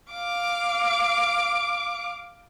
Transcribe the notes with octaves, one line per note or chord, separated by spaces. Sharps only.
F5 D6